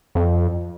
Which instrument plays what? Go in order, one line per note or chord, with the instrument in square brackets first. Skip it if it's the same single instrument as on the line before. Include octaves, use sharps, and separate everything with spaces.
[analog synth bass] F2